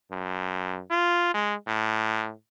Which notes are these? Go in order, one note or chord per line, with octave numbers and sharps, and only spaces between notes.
F#2
F4
G#3
A2